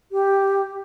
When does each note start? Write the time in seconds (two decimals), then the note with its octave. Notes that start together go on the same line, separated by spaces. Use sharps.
0.12 G4